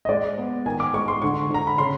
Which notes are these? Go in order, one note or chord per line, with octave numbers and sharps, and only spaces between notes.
D#5
G#3 D5
B3
D#3 G#5
D6
G#3 C#6
C6
D3 C#6
D3 A#5
B5
C#3 C6